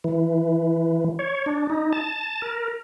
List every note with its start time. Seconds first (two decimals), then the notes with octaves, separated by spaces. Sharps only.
0.04 E3
1.19 C#5
1.46 D4
1.70 D#4
1.93 A5
2.42 A#4